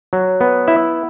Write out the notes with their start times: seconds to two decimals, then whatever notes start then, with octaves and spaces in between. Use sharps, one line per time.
0.13 F#3
0.41 B3
0.68 E4 E5